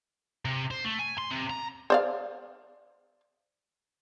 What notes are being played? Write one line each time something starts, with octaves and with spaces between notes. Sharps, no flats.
C3
C5
A3
G#5
C6
C3
A#5
C5 D5 F5